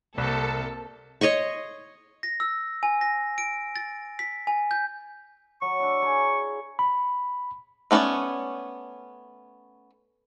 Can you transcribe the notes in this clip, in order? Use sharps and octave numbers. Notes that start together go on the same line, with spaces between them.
C2 C3 A#3 A4
C#5 D#5 C6 C#6
A#6
E6
G#5
A#6
D7
A6
B6
G#5
G6
F#3 C#6
D4 E4
G#4 C#5 A#5
B5
A3 B3 C#4 D4 D5